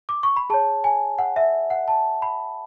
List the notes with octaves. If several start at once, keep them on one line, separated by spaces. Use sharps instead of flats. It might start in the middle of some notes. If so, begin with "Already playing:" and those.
D6
C#6
B5
G#4 C#5 A5
G#5
F#5
E5
F#5
A5
B5